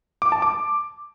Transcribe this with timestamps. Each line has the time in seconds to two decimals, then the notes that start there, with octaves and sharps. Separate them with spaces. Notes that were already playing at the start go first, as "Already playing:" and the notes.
0.22 D6
0.32 A5
0.42 D6